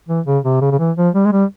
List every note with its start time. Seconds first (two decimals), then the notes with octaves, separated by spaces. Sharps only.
0.08 E3
0.26 C#3
0.44 C3
0.61 C#3
0.71 C#3
0.79 E3
0.97 F3
1.15 G3
1.26 G#3
1.32 G3